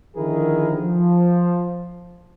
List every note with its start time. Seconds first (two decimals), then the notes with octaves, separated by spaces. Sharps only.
0.15 D3 D#3 F3 E4 G#4 A#4
0.78 F3